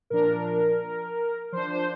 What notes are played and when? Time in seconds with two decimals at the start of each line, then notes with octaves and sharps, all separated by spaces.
0.10 A#2 F3 D4 A#4
1.52 F3 D4 C5
1.70 C5